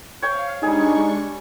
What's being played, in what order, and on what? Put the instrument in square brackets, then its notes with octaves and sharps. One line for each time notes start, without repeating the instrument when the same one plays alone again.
[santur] C#5 G5 [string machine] F5
[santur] G3 G#4 [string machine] G#3 D4 C#6 [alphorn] D#4